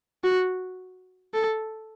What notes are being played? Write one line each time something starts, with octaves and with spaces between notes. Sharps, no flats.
F#4
A4